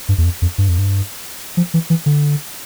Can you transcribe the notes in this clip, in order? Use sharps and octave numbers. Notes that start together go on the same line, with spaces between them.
G2
E2
F2
F2
G2
F2
G2
F3
E3
E3
D3